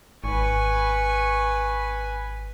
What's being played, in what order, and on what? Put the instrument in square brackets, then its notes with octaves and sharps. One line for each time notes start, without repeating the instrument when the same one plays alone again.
[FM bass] G#1 [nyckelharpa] B4 G#5 [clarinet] C#6